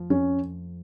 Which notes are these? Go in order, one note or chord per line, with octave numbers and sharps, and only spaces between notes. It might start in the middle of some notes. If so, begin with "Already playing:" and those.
Already playing: F2 F3
F2 C#4